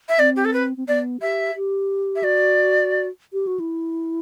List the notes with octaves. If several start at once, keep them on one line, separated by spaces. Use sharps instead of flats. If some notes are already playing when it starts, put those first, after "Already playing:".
E5
C4 D5
G4
A4
B4
C4
B3 D5
G4 E5
G4
E5
F#4 D5
G4
F#4
E4